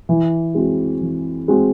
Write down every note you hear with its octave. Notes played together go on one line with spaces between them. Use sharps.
E3
G#3 C4 F#4
E3
G#3 C4 F#4